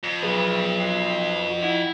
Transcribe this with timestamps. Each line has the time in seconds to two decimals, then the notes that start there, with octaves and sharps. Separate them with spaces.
0.04 F2
0.23 F#3 G#4 B4
0.80 C7
1.63 E4 F#5